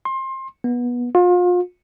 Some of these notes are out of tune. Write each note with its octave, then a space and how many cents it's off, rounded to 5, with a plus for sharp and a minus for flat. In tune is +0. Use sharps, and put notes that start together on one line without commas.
C6 +25
B3 -20
F4 +35